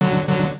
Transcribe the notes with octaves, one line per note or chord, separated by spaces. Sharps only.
D3 F#3
D3 F#3